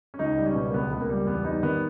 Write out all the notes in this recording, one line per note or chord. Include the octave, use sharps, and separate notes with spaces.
C#4
C#2 D#4
G3
C#4
B2
A#3
C#2 B3
C#2 B3
A#3
G3
E2 B3
G3 D#4
D#3 B3